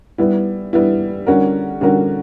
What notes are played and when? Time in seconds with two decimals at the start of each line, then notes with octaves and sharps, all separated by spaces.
0.18 G3 B3 E4
0.73 G3 B3 E4
1.27 D3 G3 C#4 F#4 A#4
1.81 D3 G3 C#4 F#4 A#4